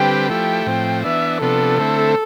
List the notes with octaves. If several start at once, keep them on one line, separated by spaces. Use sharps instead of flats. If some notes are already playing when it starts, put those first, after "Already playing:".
Already playing: D3 G3 C4 G4 B4 G5
F3 A3 E4 G4 G5
A2 F3 C4
E3 B3 D4 E5
C3 F3 B3 D4 A4
D3 A3 C4 E4